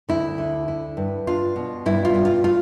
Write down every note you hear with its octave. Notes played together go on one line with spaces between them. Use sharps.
D2 E4
D3
E4
G2
D4 F4
B2
G2 E4
F4
G2
F4
A3 F4